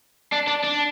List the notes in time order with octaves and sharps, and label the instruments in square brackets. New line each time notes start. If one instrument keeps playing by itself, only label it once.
[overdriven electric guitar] D4
D4
D4